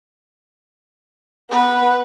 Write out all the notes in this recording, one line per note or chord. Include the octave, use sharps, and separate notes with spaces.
B3 B4